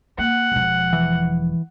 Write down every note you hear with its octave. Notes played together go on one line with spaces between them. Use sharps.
A#3 F#5
E1 F3
E3